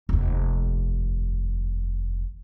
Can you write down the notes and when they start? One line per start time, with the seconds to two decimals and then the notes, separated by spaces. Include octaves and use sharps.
0.09 F1 D#2